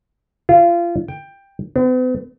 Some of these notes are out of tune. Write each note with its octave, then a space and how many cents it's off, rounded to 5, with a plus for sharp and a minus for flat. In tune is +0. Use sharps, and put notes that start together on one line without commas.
F4 -25
G5 +15
B3 +45